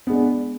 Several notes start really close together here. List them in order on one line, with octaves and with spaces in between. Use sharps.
B3 G#3 D4